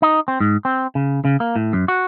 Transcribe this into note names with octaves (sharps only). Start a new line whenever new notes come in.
D#4
C4
G#2
C4
C#3
C#3
A#3
A2
F#2
F#4